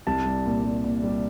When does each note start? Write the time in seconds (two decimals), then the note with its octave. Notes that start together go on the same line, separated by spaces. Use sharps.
0.07 C2 A5
0.26 G3
0.46 A#2
0.65 G3
0.84 A#2
1.03 G3